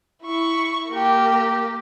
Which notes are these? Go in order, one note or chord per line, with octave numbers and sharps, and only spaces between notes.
E4 C#6
A#3 G4